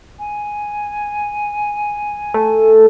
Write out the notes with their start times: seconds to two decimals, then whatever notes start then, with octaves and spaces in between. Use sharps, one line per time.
0.19 G#5
2.34 A3